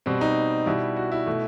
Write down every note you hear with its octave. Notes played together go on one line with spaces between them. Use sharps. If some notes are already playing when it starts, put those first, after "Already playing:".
B2 G3 C4
D#4
B2 G3 E4
F#4
E4
B2 A3